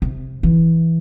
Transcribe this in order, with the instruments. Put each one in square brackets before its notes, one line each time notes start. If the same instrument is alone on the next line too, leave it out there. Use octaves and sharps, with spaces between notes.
[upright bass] C3
E3